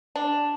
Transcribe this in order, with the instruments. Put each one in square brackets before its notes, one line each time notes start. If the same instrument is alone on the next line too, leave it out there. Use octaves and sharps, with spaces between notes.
[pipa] D4